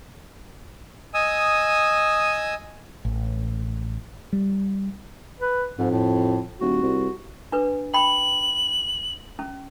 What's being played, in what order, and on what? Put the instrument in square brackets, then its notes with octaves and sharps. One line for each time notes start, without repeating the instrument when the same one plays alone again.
[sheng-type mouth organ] D#5 G#5 D#6 E6
[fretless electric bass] A1
G3
[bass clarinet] B4
[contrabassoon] F2 [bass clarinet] G#2
[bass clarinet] A2
[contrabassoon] D#1 [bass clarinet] F#4
[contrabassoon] C2
[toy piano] D4 B4
[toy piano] G5 B5 [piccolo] F#7
[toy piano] C#4